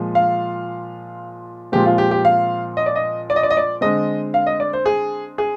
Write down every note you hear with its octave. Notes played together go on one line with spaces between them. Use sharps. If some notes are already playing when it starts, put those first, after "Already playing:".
Already playing: A#2 F3 G#3
F5
A#2 F3 G#3 C4 G4
F4
G4
G4
F5
D#5
D5
D#5
D5
D#5
D5
D#5
D5
D3 G#3 C4 D#5
F5
D#5
D5
C5
G#4
G#4